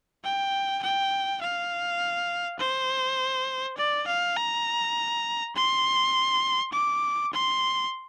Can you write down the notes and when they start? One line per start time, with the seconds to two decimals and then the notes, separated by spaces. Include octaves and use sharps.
0.24 G5
0.83 G5
1.41 F5
2.59 C5
3.77 D5
4.07 F5
4.37 A#5
5.55 C6
6.72 D6
7.33 C6